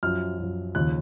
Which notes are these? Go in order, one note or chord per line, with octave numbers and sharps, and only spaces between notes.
F#2 F3 F6
F#2 F3
D#2 C#3 F3 F#6